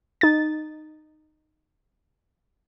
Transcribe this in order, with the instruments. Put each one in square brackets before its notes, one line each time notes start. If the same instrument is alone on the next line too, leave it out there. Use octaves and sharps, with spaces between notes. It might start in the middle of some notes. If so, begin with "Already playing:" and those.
[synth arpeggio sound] D#4 A6